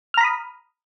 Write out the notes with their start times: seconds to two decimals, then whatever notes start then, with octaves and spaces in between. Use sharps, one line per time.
0.14 F6
0.17 A#5
0.21 B5
0.24 D#6